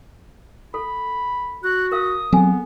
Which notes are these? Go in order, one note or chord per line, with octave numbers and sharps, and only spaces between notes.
A4 B5
F#4 F#6
A#4 F5 D#6
F#3 B3 C4 G#4 A4 G#5